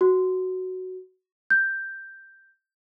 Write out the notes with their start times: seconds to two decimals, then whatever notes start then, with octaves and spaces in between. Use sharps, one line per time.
0.01 F#4
1.50 G6